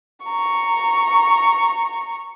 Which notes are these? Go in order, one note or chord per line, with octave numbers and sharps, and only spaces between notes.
A#5 C#6